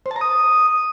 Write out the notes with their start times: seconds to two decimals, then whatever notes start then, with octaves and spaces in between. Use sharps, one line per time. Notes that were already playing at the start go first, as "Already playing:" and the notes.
0.06 C5
0.11 A5
0.16 A#5
0.21 D#6